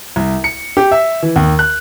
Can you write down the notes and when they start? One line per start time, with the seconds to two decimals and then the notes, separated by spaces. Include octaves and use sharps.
0.16 C2
0.44 C#7
0.77 G4
0.91 E5
1.23 E3
1.36 D#2
1.59 F#6